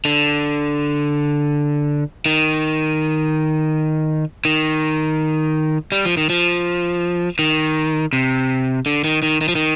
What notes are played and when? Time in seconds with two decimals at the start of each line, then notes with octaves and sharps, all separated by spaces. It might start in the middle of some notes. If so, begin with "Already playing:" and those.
0.05 D3
2.26 D#3
4.45 D#3
5.92 G3
6.05 F3
6.17 D#3
6.30 F3
7.39 D#3
8.13 C3
8.86 D3
9.04 D#3
9.23 D#3
9.41 D#3
9.49 F3
9.55 D#3